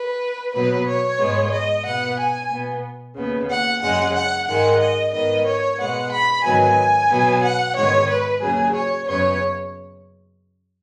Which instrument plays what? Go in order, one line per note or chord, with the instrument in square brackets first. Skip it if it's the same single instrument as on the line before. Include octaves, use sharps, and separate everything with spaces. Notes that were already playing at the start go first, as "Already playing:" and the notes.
Already playing: [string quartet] B4
B2 F#3 B3 B4
C#5
G#2 G#3 B3
D#5
B2 B3 F#5
G#5
B2 B3
D#2 C#3 B3
F#5
F#2 C#3 G#3 F#5
F#5
G#2 D#3 G#3 F#5
D#5
G#2 D#3 B3 D#5
C#5
B2 G#3 B3 F#5
B5
G#2 D#3 F#3 B3 G#5
B2 F#3 B3
F#5
G#2 D#3 G#3 B3 C#5
B4
D#2 C#3 F#3 G#4
C#5
F#2 C#3 B3 C#5